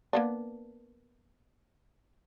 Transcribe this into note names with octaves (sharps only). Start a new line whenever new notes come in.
A#3 B3 D4